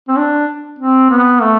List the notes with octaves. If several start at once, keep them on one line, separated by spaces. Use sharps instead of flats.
C4
D4
C4
B3
A3